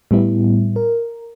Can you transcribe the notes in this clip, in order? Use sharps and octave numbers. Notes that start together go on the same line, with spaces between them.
A2 G3 B3 E4
A#4